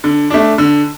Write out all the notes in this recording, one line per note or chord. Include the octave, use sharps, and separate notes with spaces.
D3
A3 D4
D3